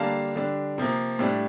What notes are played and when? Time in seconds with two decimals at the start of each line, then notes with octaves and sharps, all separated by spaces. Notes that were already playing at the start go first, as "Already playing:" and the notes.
Already playing: D3 G3 A#3 D4 F5 A5
0.36 D3 G3 D4
0.78 C3 F3 A#3
1.19 A2 G3 D4